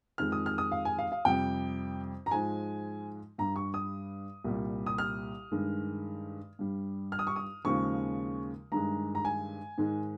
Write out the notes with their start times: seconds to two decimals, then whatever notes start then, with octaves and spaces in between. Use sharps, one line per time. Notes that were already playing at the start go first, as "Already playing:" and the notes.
0.18 F2 D#3 G#3 F6
0.32 D#6
0.46 F6
0.58 D#6
0.72 F5
0.85 G#5
0.99 F5
1.12 F5
1.25 F2 C3 G3 G5
2.26 A#5
2.31 G#2 F3 G#3 G#5
3.38 G2 G3 A#5
3.56 C#6
3.74 D#6
4.44 C2 A#2 G3
4.86 D#6
4.98 F6
5.52 G2 D#3 G#3
6.59 G2 G3
7.12 F6
7.19 D#6
7.27 C#6
7.36 D#6
7.65 D#2 C#3 F3 G#3 C#6
8.72 G2 D#3 G#3 A#5
9.15 A#5
9.25 G#5
9.78 G#2 D#3 G#3